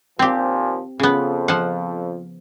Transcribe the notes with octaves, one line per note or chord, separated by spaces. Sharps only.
D#2 A#2 F3 C4 G4
F2 C#3 B3
F3 F#5